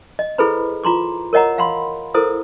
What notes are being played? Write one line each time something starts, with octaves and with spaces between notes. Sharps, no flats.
D#5
E4 G#4 A4 B4 C5 B5
F4 A#5 C6 D6
A#4 C#5 D#5 F#5 A#5
F5 F#5 B5 C6
E4 A4 A#4 C5 D#6